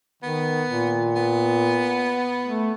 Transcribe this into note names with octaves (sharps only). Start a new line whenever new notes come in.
D#3 B3
A#2
B3
A3